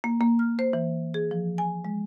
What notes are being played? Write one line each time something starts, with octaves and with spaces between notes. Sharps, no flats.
A#3
A#3
F6
C5
E3
G#4
F3
G#5
G#3